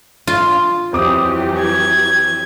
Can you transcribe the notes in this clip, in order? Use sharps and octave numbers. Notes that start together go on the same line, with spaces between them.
F4
F2 E3 F#3 G4 D6 D#6
G#6